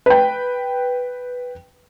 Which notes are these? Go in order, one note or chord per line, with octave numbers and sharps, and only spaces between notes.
B4 G5